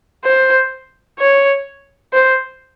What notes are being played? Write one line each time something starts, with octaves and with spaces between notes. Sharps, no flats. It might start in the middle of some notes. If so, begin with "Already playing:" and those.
C5
C#5
C5